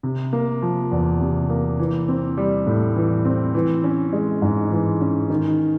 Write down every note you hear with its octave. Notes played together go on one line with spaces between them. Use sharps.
C3
A#3
F3
E2
C3
A#3
E3
C4
G3
A2
E3
C4
E3
C#4
G#3
G#2
E3
C#4
D#3